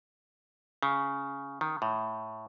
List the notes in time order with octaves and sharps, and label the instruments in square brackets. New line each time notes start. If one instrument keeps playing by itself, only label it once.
[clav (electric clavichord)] C#3
D#3
A2